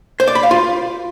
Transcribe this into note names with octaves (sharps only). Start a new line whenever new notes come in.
C5
D5
B5
F5
F4